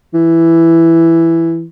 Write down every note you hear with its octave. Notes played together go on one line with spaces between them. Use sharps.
E3